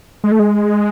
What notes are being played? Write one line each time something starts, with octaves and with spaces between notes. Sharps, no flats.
G#3
A3
G#3